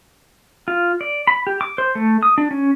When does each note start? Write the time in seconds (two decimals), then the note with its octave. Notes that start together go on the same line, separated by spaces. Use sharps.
0.68 F4
1.01 D5
1.27 B5
1.47 G4
1.61 D6
1.78 C5
1.95 A3
2.23 D#6
2.38 D4
2.51 C#4